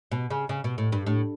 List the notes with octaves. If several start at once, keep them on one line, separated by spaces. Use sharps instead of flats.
B2
C#3
C#3
B2
A2
G2
A2